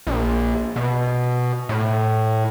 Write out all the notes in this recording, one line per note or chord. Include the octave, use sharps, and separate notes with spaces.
A#1
B2
A2